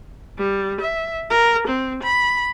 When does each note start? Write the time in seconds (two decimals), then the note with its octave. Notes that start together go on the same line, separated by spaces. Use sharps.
0.38 G3
0.81 E5
1.30 A#4
1.68 C4
2.03 B5